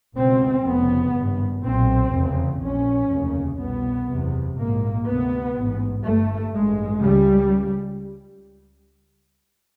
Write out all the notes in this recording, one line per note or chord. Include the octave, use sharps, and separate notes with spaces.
C#2 B2 C4
F1 F2 C#3 B3
G#1 G2
B1 A#2 C4
F1 E2 C#3
A#1 A#2 C#4
F1 D#2 C#3
C2 B2 B3
F#1 E2 C3
A#1 G#2 A#3
D2 C3 B3
A1 G#2
G1 G2 A3
A1 G2 G#3
C#2 C#3 G3